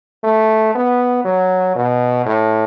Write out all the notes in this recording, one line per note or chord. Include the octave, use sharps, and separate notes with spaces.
A3
B3
F#3
B2
A2